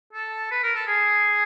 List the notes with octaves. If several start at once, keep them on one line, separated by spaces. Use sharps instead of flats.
A4
B4
A#4
A4
G#4